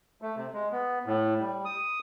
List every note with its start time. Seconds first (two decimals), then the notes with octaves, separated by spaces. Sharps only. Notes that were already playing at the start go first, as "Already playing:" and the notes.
0.22 A3
0.37 C3
0.53 G#3
0.72 B3
1.06 A2
1.40 G3
1.65 D#6